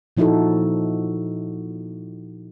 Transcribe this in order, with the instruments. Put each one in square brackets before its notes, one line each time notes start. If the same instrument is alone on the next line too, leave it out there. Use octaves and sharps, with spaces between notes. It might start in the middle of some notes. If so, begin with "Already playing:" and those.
[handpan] A#2 F3 D#4 E4 F#4 A4